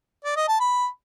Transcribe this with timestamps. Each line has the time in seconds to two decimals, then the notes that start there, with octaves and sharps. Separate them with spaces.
0.24 D5
0.36 D#5
0.48 A5
0.60 B5